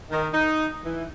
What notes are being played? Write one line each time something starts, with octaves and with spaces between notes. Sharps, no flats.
D#3
D#4
E3